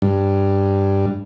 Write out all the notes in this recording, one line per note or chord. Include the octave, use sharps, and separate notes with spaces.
G2